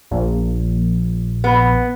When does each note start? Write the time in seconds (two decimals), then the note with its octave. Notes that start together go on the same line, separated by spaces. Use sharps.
0.11 A#1
1.44 B3